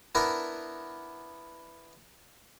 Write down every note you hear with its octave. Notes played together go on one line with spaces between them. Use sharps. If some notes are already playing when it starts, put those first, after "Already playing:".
B3 D4 E4 A#4